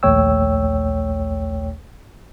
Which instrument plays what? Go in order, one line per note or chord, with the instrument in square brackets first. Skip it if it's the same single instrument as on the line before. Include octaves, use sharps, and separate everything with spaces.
[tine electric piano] A#1 D#2 A3 C#5 G5 E6